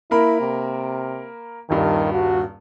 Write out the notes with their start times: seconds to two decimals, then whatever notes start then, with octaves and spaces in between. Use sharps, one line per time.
0.11 A#3 E4 A#4 B5
0.41 C3
1.70 D#1 G2 D#3
2.12 F#4